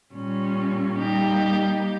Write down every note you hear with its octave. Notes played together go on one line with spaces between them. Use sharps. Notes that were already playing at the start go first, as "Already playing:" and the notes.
A#2 G3 C#4
G3 A#3 D#4 G4